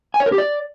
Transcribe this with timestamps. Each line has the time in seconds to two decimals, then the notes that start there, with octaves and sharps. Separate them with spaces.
0.14 G#5
0.20 C#5
0.26 A#4
0.32 G4
0.38 D5